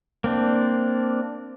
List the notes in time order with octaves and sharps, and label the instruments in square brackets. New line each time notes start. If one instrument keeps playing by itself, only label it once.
[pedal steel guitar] A#3 C4 D4